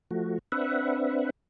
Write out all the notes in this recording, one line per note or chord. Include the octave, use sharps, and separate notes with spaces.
F3 A3 F#4
C4 D4 B4 E5 F#5